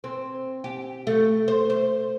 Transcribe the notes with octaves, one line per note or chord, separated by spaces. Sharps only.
C4
G4
A3
C5
C5